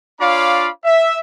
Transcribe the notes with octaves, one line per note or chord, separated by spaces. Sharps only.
D4 F4 C#5 F5 B5 D6
E5